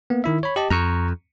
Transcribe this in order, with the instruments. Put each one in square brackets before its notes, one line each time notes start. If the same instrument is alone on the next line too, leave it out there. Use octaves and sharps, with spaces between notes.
[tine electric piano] A#3 B3
D#3 E4 E5
C#5 B5
G4 D#5 A5
[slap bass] F2 [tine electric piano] A#5 C#6